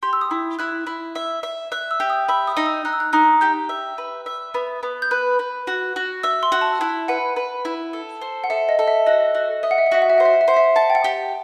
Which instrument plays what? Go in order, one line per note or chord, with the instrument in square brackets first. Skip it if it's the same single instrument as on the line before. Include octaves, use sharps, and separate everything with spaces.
[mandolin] G4 [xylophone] C6
[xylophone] E6
D#6
[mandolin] E4
[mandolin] E4 [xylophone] F#6
[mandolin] E4
E5
E5
[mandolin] E5 [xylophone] F#6
[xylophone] E6
[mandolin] G4
[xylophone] D#6
[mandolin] E5 [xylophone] B5
[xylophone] D#6
[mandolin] D#4
[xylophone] E6
[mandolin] D#4 [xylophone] F#6
[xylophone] E6
F#6
[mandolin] D#4 [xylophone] F#6
[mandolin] G4 [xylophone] G6
[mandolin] E5
B4
E5
B3
B3
[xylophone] G6
[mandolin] B4 [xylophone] F#6
[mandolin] B4
F#4
F#4
[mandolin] E5 [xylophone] E6
[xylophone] C6
[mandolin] F#4
[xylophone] A5
[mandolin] E4
[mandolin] B4 [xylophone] F#5
[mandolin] B4
E4
A4
C5
[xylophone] F#5
[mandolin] A4 [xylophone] E5
[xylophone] D#5
[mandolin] A4
[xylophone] E5
[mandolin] F#4 [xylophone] D#5
[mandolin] F#4
[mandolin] D#5 [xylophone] E5
[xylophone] F#5
E5
F#5
[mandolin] F#4 [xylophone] E5
[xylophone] F#5
E5
[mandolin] C5 [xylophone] F#5
[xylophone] E5
F#5
E5
[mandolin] C5 [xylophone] F#5
[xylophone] E5
[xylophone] F#5 [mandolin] A5
[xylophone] G5
F#5
[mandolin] G4